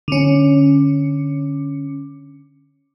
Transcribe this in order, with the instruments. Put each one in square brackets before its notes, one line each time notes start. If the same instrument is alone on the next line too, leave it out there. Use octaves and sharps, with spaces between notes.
[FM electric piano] D3 C#4